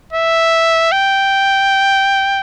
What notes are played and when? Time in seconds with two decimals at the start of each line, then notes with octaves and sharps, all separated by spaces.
0.13 E5
0.92 G5